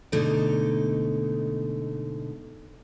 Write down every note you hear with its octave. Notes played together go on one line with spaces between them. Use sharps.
G#2 B2 D3 A3 D#4